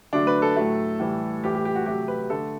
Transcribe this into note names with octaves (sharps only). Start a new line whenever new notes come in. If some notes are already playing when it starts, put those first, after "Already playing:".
D3 F#3 A3 D4
B4
A4
A2 F#3 A3
A2 E3 G3
A2 E3 G3 G4
G4
G4
F#4
C3 F#3 A3 G4
B4
D3 A3 A4